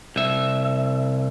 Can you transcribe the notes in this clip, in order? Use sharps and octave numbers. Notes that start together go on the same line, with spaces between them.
C2 E5